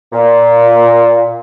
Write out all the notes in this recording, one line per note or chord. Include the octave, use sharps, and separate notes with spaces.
A#2